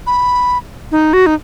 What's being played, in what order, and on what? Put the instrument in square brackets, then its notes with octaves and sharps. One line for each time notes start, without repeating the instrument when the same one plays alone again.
[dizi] B5
[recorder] D#4
F#4
D#4